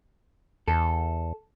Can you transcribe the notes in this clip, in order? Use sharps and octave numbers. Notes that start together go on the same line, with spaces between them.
E2 A4